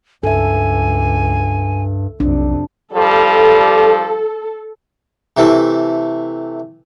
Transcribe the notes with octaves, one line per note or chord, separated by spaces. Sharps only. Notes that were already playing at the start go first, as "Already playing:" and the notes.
C#2 G2 A4 E5 G#5
B1 F2 C3 D4
G2 F3 G3 A4
C3 E3 A3